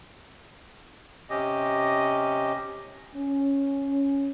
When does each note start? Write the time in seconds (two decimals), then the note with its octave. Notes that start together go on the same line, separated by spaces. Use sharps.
1.30 C3 C#4 G4 D#5
3.16 C#4